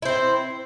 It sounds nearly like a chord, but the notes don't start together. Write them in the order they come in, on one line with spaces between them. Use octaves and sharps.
E4 C5 C4